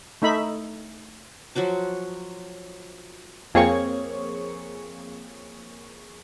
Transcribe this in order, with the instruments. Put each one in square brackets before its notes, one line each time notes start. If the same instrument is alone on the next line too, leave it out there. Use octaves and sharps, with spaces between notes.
[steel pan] A3 D#4 E5 B5
[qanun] F3 F#3 F#4 D6
[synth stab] F2 A#3 C4 G#4 C#5 C#6